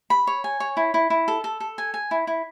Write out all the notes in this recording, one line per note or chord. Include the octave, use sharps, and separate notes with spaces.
B5
C#5
G#5
C#5
E4
E4
E4
A4
A4
A4
G#5
G#5
E4
E4